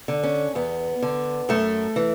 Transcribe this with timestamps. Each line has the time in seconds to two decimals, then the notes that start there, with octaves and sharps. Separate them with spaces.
0.08 D3
0.23 C#4
0.55 E2 B3
1.02 D3
1.49 F#2 A3
1.96 E3